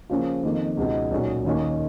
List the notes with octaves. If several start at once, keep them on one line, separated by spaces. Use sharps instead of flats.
C#3 F3 A#3 C#4 F4
F2 D#3 A#3
C#2 B2 G#3 B3 D#4
B1 A#2 F#3 C#4
D#2 D#3 A#3 C#4